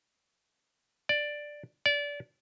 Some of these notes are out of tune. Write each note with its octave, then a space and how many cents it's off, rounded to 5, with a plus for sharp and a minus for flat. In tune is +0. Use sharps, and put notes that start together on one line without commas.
D5 +5
D5 -25